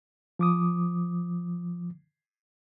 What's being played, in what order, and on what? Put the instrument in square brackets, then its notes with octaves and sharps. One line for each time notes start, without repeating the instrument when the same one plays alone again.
[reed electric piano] F3 D6 D#6